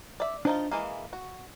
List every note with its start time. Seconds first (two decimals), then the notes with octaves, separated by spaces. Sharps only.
0.20 D5 E5
0.45 F3 D4 D#4 F4
0.71 E3 G#3 A#3 F5
1.13 F#4